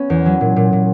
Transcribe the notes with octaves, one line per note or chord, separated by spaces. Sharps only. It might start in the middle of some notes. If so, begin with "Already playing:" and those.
Already playing: B3 C#4
E2
F#3
A#2
A#2
A#2